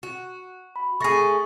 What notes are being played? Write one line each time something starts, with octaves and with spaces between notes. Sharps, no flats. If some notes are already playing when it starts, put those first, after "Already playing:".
F#4
B5
A3 G#4 C#6 A#6